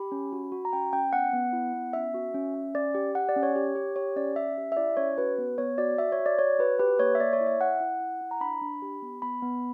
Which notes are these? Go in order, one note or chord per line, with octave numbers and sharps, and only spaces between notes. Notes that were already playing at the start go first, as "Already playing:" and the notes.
Already playing: G4 B5
C#4
F#4
F#4
A#5
C#4 G5
C#4 G5
B3 F#5
B3
E4
B3
C#4 E5
F#4
C#4
C#4
C#4 D5
G4
G4 F#5
D5
C#4
C#5
G4
G4
G4 C#5
C#4 D5
C#4 E5
G4
E5
E4 D5
C#4 C#5
F#4 B4
B3
B3 C#5
F#4 D5
F#4 E5
C#5
F#4
D5
F#4 C#5
F#4 B4
G4 B4
A#3 C#5
E5
A#3 D5
C#5
E4
E5
E4 F#5
E4
E4
E4
A#5
D4 B5
D4
G4
B3
B3 B5
B3